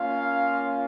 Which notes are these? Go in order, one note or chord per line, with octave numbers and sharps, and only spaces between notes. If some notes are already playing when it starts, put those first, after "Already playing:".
Already playing: A#3 C#4 F4 F5